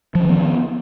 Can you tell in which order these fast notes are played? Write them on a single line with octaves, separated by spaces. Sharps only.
F3 C#4 D#3 B3